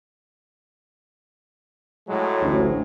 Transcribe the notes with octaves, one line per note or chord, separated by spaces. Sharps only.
A2 F#3 G#3
A1 D2